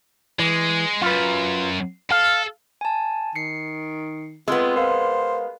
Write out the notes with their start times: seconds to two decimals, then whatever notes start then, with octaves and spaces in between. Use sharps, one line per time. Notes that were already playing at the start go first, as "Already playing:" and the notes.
0.39 E3 G#3
1.02 F#2 F4 B4
2.11 A4 F5
2.81 G#5 A5
3.35 D#3 C7 C#7
4.48 G#3 B3 C4 F4 E6
4.76 A#4 C5 F5